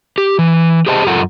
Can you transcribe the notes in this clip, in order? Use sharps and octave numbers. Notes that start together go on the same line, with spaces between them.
G4
E3
G4 G#4 C5 D#5 A5
F#2 F4 A4 A#4 F#5 A#5